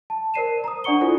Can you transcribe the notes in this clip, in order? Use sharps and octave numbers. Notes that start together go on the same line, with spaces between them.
A5
A#4 C5 D5 C7 D#7 E7
A#5 D#6
D4 D5 F#5 C#6 C#7 G7
E4 F4 A4 C5 D5